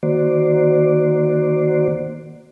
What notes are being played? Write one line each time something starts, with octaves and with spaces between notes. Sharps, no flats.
D#3 A#3 F#4 C5 D5